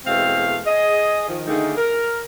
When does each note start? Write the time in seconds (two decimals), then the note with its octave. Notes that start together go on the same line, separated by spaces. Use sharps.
0.06 E2 B2 G#3 A3 C4 F5
0.65 G#4 D#5
1.27 D#3 F3
1.47 D3 D#3 A3 A#3 D#4 G#4
1.76 A#4